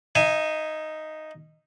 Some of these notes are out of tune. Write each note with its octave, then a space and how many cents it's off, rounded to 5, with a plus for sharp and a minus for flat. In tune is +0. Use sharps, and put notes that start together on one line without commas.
D#4 +0 E5 +40 G#5 +0